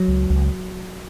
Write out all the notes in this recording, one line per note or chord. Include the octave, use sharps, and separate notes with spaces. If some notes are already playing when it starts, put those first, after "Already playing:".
Already playing: F#3
C#2
C#2